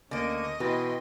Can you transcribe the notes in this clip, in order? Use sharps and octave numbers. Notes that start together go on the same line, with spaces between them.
D2 D3 A#3 C#4 D#5
B2 E3 B4 G5 C6